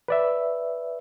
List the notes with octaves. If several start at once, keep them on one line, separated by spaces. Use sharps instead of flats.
B4 D5 E5